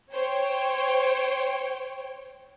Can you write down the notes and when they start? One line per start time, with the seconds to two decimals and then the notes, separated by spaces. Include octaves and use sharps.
0.11 C5 C#5 G5